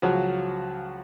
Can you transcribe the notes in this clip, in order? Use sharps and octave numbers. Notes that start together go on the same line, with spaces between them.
C#2 C#3 F3 F#3 F#4